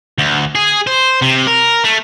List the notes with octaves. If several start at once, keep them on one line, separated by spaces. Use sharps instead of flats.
D2
G#4
C5
C3
A#4
A3